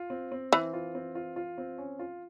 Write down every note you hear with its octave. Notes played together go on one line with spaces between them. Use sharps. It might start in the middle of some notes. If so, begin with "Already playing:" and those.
Already playing: F4
C4
C4
E3 C4
F4
C4
F4
F4
C4
C#4
F4